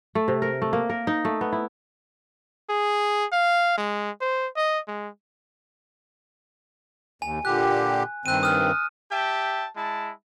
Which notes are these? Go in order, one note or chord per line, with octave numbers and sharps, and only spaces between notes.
A3
C3
A#4
A3
A#3
A#4
D#4
A3
B3
E4
G#4
F5
G#3
C5
D#5
G#3
D#2 G#5
A#2 D3 G4 F#6
G2 D#3 C4 F#6 D#7
D#6 F6
G4 E5 G5 A5
G#3 E4 A5